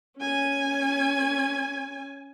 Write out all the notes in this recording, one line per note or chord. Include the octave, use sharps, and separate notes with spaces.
C#4 G#5